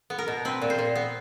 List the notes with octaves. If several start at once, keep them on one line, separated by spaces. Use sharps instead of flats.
B3
A#4
B2
C4 B4
A#2
C5
A#2
B3